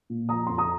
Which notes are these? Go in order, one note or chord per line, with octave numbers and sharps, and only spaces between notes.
A#2
F3 A#5 D#6
F2 C6
A#5 D#6